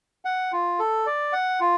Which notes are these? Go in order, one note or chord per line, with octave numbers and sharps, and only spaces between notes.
F#5
F4
A4
D5
F#5
F4